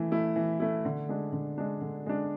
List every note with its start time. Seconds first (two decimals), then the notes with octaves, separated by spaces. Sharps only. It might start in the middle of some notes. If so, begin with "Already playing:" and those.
Already playing: E3 A3 E4
0.12 A3 E4
0.36 E3
0.60 A3 E4
0.85 D3
1.09 G#3 D4
1.33 D3
1.58 G#3 D4
1.81 D3
2.06 G#3 D4